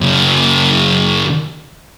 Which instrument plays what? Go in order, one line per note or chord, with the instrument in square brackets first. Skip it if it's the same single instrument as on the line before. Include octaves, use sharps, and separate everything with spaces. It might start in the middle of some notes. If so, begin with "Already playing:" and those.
[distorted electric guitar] F#2 C#3